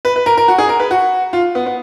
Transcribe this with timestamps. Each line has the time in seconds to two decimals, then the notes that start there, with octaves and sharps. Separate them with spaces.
0.05 B4
0.16 B4
0.26 A#4
0.37 A#4
0.48 F#4
0.58 G#4
0.69 A#4
0.80 B4
0.91 F#4
1.33 F4
1.55 B3
1.66 B3